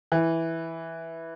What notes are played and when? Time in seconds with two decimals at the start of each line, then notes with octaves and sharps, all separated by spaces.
0.12 E3